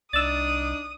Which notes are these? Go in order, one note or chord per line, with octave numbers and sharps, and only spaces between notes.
C2 D4 D#4 D5 D#6 E6 A6